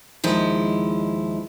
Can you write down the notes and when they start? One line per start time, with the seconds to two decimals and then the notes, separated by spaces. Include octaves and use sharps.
0.24 D#2 F3 G#3 E4